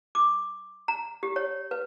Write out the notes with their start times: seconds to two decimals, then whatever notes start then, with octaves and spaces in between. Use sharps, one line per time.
0.15 D6
0.88 A#5
1.23 G4
1.36 C#5
1.71 B4